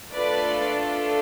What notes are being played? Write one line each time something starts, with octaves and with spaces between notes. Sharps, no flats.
A3 D4 F4 A4 B4 D5